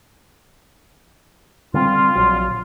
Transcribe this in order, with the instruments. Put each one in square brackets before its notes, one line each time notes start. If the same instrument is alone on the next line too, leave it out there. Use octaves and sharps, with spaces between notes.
[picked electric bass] D3 G3 C4 [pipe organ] F4
[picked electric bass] A#1 F#3